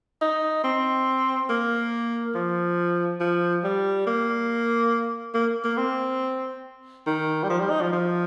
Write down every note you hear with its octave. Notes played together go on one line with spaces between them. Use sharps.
D#4
C4
A#3
F3
F3
G3
A#3
A#3
A#3
C4
D#3
G3
F3
G3
D#4
F3
F3